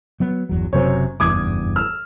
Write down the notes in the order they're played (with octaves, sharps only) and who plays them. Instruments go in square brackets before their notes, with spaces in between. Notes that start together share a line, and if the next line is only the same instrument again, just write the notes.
[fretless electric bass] F#3 B3
G1 E2 F#3
[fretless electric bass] F#1 C3 F#3 [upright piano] F#2 C5 C#5
[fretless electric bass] F#1 E2 G2 [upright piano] D6 D#6 G#6
[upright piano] E6 F6